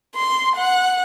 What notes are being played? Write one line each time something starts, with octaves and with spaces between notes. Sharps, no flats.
C6
F#5